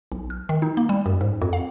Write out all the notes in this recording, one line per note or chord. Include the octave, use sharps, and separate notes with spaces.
B1
F6
D#3
D#4
A#3
G3
F#2
G#2
F2
F5